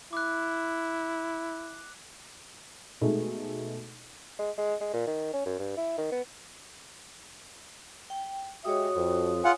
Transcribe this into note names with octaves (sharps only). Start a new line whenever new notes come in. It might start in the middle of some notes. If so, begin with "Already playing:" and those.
E4 D6 F#6
B2 G#3 A3 D#4
G#3
G#3
G#3
A#2
D#3
C#4
F#2
G2
E4
D#3
B3
G5
G#3 F#4 G4 C#5 E5 D#6
F2
F4 G#4 F5 F#5 G#5